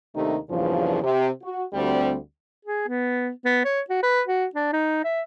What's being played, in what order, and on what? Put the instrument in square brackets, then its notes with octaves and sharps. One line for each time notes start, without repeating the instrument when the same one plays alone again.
[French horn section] D#2 C3 D#3 A3 D4 D#4
E2 G2 A#2 C#3 F3
C3
F#4
D2 G3 C4
[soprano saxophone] G#4
B3
B3
C#5
F#4
B4
F#4
D4
D#4
E5